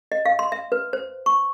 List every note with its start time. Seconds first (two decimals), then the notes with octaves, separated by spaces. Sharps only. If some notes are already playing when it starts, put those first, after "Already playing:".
0.12 D#5
0.26 F5
0.39 C6
0.52 E5
0.72 B4
0.93 C5
1.26 C#6